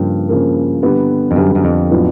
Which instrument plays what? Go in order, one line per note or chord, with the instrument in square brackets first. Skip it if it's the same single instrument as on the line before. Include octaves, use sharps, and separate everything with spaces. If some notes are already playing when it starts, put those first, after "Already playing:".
Already playing: [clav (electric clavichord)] G2 [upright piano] C#3 F3 A#3
[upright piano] C#3 F3 A#3
D3 G3 B3
[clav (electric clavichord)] F2
[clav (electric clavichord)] F#2 [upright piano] D3 G3 B3
[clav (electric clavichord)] F#2
F2
[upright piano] A2 F#3 B3 D4 F4